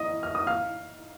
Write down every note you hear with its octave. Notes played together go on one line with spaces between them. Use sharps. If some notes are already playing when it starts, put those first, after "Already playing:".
Already playing: D#5 D#6
F6
D#6
F5 F6